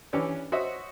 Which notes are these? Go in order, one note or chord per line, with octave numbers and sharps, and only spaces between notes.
E3 C#4 D4 G4 B4 C#5
F#4 C5 C#5 D#5 E5 D#6